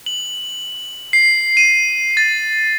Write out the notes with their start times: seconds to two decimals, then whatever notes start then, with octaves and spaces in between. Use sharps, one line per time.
0.06 F#7
1.13 C7
1.57 D#7
2.17 A6